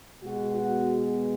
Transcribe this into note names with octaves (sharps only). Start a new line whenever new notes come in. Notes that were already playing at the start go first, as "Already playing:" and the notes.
B2 G#3 B3 F#4
F#4